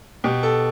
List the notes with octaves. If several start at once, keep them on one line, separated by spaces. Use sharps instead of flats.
B2 G4
A4